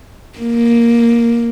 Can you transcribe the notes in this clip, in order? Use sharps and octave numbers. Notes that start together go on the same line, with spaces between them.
A#3